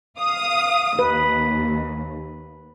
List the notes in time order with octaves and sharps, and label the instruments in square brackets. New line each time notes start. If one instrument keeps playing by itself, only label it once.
[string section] F5 D#6
[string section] D#2 [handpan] B4